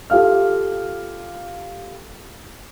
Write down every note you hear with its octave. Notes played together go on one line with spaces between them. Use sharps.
F4 G4 A4 F5 F6